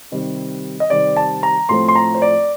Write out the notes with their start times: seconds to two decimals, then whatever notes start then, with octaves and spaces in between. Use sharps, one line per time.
0.12 C3 D#3 G3 C4
0.80 D#5
0.90 C3 D#3 G3 C4 D5
1.17 A5
1.43 A#5
1.69 A2 F3 A3 C4 C6
1.88 C6
1.95 A#5
2.15 C5
2.22 D5